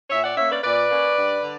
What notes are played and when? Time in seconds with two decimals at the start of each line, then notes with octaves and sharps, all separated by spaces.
0.10 A#2 C#5 E5
0.23 D5 F#5
0.37 A#3 C#4 C#5 E5
0.50 B4 D5
0.63 A#2 B4 D5
0.90 A#3 C#4
1.16 G2
1.42 D3